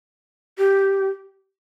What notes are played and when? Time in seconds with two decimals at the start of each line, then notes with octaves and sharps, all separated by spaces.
0.58 G4